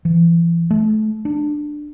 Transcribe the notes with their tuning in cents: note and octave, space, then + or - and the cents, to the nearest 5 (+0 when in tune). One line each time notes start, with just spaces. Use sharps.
E3 +40
A3 -30
D4 +15